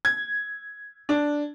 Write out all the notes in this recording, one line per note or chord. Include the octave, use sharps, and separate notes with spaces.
G#6
D4